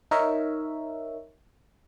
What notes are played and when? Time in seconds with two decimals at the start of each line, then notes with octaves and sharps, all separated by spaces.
0.11 D#4 A#4 C#5 E5